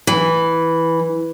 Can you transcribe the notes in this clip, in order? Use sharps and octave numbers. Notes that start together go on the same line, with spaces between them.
E3